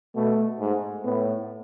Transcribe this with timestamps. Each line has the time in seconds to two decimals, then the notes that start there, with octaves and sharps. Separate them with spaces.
0.16 B2 A3
0.60 G#2
1.04 A2 B3